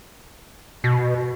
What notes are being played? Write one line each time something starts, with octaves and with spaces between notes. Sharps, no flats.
B2